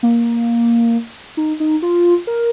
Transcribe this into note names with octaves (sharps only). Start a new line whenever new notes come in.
A#3
D#4
D#4
F4
A#4